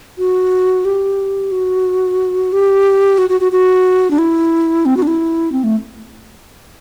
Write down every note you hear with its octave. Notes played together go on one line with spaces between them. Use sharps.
F#4
G4
F#4
G4
F#4
F#4
F#4
F#4
D4
E4
C4
F#4
D4
E4
C4
A3